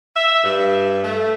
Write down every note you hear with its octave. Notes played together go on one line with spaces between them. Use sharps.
E5
G2
A3